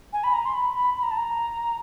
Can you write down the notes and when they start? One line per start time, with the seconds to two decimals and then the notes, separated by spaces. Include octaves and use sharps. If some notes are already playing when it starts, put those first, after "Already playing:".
0.13 G#5
0.24 B5
0.34 A#5
0.45 C6
0.54 B5
0.75 B5
0.96 B5
1.03 A#5
1.11 A5
1.17 A#5